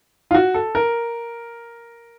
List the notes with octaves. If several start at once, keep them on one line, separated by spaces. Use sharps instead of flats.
F4
F#4
A4
A#4